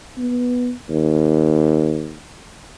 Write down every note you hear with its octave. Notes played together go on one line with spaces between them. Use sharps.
B3
D#2